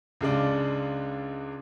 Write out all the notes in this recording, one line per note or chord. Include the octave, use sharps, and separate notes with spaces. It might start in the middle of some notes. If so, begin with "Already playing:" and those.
C#2 C#3 G#3 D4